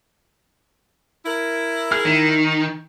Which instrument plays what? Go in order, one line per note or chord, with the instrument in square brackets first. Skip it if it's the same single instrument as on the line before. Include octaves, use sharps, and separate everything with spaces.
[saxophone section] E4 A#4
[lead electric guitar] G#4 [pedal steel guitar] F6
[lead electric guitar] D#3 [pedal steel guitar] D#4